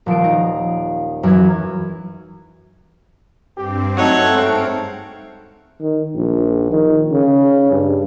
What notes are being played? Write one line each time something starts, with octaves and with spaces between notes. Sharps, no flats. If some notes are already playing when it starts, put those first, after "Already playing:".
D#1 F3 C7 D7
D#4
F#2 E3 G#6
G2 C4 G4
F#3 A3 D#4 A4 C#5 F#5
G#2 C4 F5 C#7 D7
D#3
A#1
D#3
C#3
G2